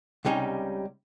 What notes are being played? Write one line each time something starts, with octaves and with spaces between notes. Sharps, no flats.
C#2 C3 G3 C#4 D#4 G4